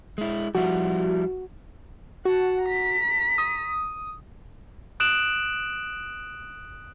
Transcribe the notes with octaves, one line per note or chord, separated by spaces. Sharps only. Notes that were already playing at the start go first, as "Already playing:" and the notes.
G#3 E4
F3 G3 E4 F#4
F#4 F#5 A5
A#5 B6
D#6
D#6 F#6 D7 E7 F#7